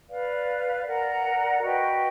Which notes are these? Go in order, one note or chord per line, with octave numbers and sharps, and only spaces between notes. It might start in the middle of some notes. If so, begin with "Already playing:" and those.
B4 D5 F5
A#4 D5 F#5 A#5
F#4 B4 D#5 G5